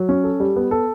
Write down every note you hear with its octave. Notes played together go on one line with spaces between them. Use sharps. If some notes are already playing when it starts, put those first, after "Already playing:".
Already playing: F#3
C#4
A4
G3
B3
A4